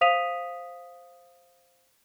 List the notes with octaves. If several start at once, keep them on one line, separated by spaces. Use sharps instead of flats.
C5 F5 D#6 B6 D#7 F7